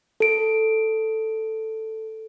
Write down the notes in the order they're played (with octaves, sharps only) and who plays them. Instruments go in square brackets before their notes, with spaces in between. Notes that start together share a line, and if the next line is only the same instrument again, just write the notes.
[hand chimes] A4 D7